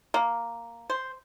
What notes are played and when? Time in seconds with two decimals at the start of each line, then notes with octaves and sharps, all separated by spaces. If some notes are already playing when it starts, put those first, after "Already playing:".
0.14 A#3
0.90 C5